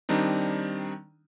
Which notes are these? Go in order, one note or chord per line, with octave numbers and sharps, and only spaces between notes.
D#3 G3 C4 D4 D#4